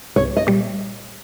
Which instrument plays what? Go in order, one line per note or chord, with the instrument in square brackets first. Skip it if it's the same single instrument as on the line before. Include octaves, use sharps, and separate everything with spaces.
[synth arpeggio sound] C2 [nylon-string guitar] C#5
[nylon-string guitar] D#5
[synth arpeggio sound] A#2 G3